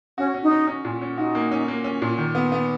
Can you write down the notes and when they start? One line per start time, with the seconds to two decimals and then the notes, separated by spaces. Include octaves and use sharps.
0.18 C#4 F#4
0.34 C#4
0.43 D#4
0.51 C#4
0.67 C#4
0.85 A#2
1.01 C#4
1.18 D#4 F#4
1.35 A#3
1.52 C#4
1.68 A#3
1.84 C#4
2.02 A#2
2.18 D#3
2.35 B3
2.52 B3